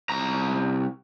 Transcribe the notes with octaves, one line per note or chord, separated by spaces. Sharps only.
C2 A#5